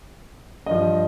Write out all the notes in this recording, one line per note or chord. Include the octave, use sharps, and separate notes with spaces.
G2 F3 D#5